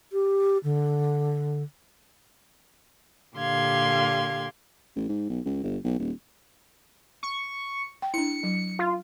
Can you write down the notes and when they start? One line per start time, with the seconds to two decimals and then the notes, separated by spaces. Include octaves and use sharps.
0.12 G4
0.64 D3
3.36 A#2 D3 G4 F5 C6 G#6
4.96 A1
5.09 G#2
5.30 B1
5.46 C#2
5.64 G1
5.84 B1
5.99 D#1
7.23 C#6
8.02 G5
8.14 D4 E4 C#7
8.43 F#3
8.79 F4